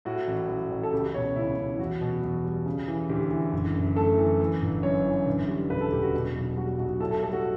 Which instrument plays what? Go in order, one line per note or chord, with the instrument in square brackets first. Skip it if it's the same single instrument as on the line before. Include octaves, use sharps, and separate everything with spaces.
[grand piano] A2 F#4
A1
A1
A1
A4
C#2 G4
B2 C#5
C#2 E4
C#2
E4
E2 F#4
B2
E2
G3
C#3
E3
D2 G4
E3
F#1
F#1
A3 A4
E3
E3
G1
F#2 C#5
E3
D2
G3
E1 B4
A4
E1 G4
F#4
B2
B1
G3 F#4
B1 F#4
A2 A4
A4
G3 A4
F#4